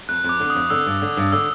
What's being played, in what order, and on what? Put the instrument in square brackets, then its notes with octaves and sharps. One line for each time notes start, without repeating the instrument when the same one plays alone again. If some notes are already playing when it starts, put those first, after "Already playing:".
[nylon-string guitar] F2 [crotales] F#6
[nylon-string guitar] F2
[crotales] D6
[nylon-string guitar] D3
[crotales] D#6
[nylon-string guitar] F2
[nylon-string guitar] D3 [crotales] E6
[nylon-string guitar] G2
D3
G2
[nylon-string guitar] D3 [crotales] E6